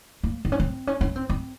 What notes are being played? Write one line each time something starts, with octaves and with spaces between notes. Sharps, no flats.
A#3
C4
C#4
C4
C#4
C#4
C4
C4